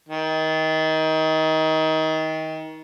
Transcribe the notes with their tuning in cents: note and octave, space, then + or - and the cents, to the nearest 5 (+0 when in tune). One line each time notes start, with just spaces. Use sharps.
D#3 +25